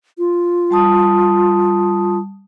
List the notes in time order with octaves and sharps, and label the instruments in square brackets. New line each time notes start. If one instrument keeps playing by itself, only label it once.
[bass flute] F4
[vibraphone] G3 A5 D#6